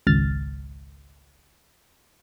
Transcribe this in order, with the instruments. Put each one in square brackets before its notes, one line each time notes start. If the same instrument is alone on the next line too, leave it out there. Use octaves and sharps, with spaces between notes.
[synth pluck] G#1 C#2 F6 A6